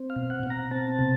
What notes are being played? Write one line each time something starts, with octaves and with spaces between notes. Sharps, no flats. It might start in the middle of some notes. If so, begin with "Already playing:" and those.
Already playing: C4
F5
B2
F#5
B2
A#5
C4 A5
C3